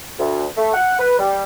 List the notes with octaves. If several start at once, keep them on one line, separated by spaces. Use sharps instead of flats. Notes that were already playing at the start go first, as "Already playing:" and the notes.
D2
A3
F#5
B4
G3